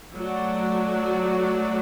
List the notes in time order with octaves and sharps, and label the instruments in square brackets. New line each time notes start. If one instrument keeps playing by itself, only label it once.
[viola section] F#3 A3 F#4 D5